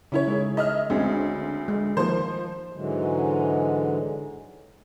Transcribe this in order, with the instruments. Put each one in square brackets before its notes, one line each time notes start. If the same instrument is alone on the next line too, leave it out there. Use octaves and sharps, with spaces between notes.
[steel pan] C#3 [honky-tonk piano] C#4 E4 C#5
[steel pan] G#3 D#4 G#4
[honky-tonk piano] D#5 E5 F6
[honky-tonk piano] D2 D3 C#4 [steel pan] G#3 C4 G#4
[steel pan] G#3
[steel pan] D#3 A#3 [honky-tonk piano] F3 C5
[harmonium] G#2 D3 E3 F#3 G#3